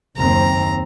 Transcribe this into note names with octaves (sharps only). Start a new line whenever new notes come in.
F#1 D#2 C4 A#5